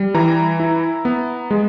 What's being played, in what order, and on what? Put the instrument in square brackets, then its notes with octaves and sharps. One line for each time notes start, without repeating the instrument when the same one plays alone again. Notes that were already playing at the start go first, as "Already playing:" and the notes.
Already playing: [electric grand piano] G3
E3 A#5
E4
B3
G#3